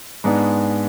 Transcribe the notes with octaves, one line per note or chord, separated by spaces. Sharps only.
G#2 G#3 B3 D4